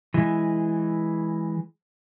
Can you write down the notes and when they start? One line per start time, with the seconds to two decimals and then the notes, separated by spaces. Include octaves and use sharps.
0.14 E3 G#3